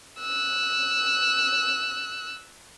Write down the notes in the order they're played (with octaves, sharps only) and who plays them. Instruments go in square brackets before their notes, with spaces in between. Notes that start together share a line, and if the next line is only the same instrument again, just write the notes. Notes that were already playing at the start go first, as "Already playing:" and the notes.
[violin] E6 F#6